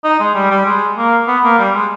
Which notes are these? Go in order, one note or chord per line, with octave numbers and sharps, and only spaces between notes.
D#4
G#3
G3
G3
G#3
A#3
B3
A#3
G3
G#3